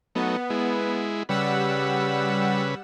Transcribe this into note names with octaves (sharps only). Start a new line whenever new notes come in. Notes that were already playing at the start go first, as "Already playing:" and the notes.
F#3 A3 B3 D#4
G#3 E4
C#3 G3 B4 F#5 E6